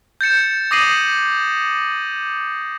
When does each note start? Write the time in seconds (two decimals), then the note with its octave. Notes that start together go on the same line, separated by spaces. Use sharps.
0.21 G6 A6 C#7 E7
0.71 D6 D#6 A#6 C7 D#7 F#7